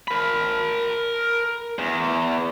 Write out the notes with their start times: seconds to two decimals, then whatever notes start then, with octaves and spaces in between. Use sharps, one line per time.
0.08 A#4 B5
1.79 E2